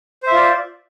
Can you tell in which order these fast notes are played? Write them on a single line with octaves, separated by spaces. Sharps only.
C5 E5 F4 D5